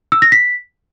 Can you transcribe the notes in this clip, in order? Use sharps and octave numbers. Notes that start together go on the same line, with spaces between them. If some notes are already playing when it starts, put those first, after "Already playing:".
E6
A#6
B6